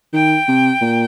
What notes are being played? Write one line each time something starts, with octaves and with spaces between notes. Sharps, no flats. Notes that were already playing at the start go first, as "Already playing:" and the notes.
D#3 G5
C3
A#2